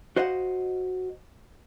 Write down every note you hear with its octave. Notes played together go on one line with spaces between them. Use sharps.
F#4 C5 D#5 F5 F#5